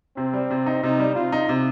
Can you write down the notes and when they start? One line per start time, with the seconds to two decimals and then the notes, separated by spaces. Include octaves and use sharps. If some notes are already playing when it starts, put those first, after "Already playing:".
0.17 C3 C4
0.34 G3
0.50 C3
0.66 D#4
0.83 C3 D#4
1.00 G3
1.15 C3 F4
1.32 D#4
1.49 C3